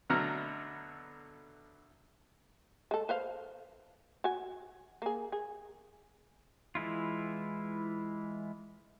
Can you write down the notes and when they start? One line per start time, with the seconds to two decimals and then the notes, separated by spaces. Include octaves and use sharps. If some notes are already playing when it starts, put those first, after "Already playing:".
0.10 B2 D3 F#3 A3 A#5 F6
2.91 G#3 A4
3.09 B4 C5 F5
4.24 F#4 G#5
5.02 A#3 G#4
5.32 G#4
6.75 E3 G#3 E4 F4